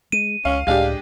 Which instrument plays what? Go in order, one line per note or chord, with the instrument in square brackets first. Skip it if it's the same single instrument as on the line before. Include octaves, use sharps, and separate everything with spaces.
[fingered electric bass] G#3 [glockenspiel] D#7
[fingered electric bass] C#2 [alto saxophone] C#4 [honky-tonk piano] F5
[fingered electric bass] C#2 A2 [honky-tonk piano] G#3 D4 G4 [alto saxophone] F5